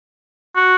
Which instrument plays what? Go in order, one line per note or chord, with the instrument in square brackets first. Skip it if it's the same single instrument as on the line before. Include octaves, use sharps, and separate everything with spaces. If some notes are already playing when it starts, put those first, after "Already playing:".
[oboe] F#4